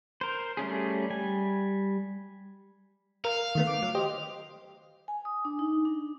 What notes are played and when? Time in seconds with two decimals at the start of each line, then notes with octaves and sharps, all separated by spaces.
0.21 A#4 C5
0.57 G3 A3 C#4 G#4
1.10 G3 G#5
3.25 A#4 F5
3.55 D#3 A3 B3
3.67 D6
3.82 F#3
3.95 G4 C5 D#5
5.08 G#5
5.25 D#6
5.45 D4
5.59 D#4
5.85 D4